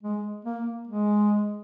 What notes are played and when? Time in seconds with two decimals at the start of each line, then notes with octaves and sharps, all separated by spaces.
0.03 G#3
0.45 A#3
0.87 G#3